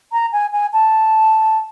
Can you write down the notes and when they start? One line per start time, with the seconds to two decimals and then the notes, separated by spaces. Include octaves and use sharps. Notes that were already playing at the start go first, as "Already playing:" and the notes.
0.12 A#5
0.32 G#5
0.52 G#5
0.73 A5